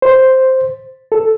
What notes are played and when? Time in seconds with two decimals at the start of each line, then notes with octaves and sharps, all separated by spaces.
0.02 C5
1.12 A4